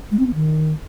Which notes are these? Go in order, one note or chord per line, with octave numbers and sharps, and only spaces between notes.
G#3
C4
B3
D#3